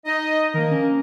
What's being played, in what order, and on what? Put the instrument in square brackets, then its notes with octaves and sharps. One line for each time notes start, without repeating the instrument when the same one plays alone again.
[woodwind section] D#4 D#5
[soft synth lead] D#3 [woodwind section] F3 A#3 A#4
[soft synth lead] C#4